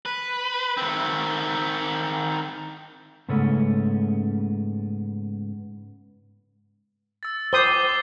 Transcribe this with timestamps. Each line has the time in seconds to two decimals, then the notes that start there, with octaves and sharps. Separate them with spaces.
0.05 B4
0.77 D#3 C4
3.29 G#2 C#3 A3 B3 C#4
7.23 E6 A6
7.53 C5 D6 D#6 C7 G7